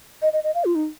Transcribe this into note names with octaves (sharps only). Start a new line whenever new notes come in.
D#5
D#5
D#5
F5
F4
D#4